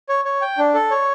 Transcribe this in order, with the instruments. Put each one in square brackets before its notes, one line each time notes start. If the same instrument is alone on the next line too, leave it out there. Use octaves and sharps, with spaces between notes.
[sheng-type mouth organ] C#5
C#5
G5
D4
A4
C#5